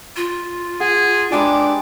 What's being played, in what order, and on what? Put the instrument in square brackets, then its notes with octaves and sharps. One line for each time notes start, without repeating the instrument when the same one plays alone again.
[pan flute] F4
[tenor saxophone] G#4 [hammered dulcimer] F#5
[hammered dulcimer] G#3 G4 B4 [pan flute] D4 [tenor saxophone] D5